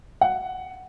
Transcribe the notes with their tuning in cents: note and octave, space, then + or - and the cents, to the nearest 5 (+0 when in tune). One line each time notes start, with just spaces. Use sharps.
F#5 +5